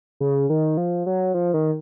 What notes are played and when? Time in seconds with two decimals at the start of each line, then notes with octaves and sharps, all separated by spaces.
0.20 C#3
0.50 D#3
0.77 F3
1.06 F#3
1.34 F3
1.54 D#3